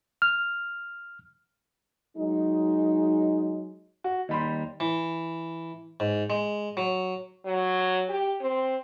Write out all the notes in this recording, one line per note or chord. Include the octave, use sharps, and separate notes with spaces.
F6
F#3 G#3 D#4
F#4
D#2 G3 D#4 B5 C6
E3
G#2
G#3
F#3
F#3
G4
C4